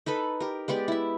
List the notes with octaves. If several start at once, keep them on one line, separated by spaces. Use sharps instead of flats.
D#4 A4 B4 B5
G4 A#4
G#3 B3 G4 D5
E4 E5